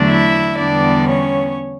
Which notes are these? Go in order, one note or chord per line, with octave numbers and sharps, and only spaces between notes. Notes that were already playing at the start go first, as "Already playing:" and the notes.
Already playing: E2 D3 F#3 A3 D4
E4 E5
E2 D3 G3 B3 D4 D5
C#4 C#5